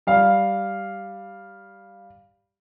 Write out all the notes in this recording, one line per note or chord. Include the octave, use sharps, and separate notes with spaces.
G3 F5